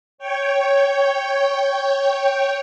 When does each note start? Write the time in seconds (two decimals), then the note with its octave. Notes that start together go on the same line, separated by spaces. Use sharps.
0.18 C#5 G5